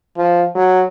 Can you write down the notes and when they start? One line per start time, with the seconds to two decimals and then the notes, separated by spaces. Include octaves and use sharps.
0.18 F3
0.55 F#3